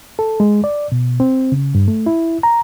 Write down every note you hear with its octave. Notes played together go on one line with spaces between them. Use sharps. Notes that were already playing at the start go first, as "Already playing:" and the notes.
A4
G#3
D5
B2
C4
C#3
G2
A3
E4
A#5